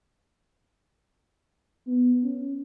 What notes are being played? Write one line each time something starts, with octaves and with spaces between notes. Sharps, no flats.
B3
C#4